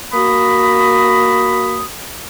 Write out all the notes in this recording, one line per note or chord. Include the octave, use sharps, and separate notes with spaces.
A#3 F#4 B5 D#6